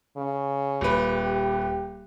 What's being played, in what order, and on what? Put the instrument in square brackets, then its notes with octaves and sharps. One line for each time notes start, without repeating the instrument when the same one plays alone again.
[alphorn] C#3
[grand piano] D#1 B4
[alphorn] G4